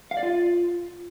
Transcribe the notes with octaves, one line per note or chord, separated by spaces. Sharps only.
F5
D5
F4